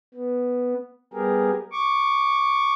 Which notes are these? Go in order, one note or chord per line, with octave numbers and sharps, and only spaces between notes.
B3
G3 B3 G4 G#4 A#4
C#6 D6